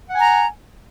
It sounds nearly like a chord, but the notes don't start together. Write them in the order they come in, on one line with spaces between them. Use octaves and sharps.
F#5 G#5 A#5